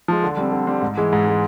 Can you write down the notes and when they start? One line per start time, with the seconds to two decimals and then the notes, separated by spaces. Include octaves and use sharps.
0.08 F3 G#3
0.23 D3
0.37 G3 C4
0.52 D3
0.67 G3 C4
0.82 G#2
0.97 E3 G#3
1.13 G#2
1.26 E3 G#3